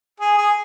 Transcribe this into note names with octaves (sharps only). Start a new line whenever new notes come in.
G#4
G#4